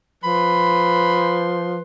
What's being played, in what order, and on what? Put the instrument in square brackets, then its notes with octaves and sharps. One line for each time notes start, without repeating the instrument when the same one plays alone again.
[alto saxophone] F3 [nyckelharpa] B4 C6 [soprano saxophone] B5